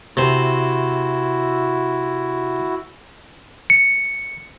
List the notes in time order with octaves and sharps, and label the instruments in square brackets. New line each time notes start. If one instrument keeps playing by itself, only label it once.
[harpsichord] C3 C5 [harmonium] E4 F#4
[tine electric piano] C#7